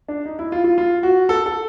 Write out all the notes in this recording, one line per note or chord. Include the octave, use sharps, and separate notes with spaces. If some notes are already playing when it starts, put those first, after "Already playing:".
D4
D#4
E4
F4
F4
F4
F#4
A4
A4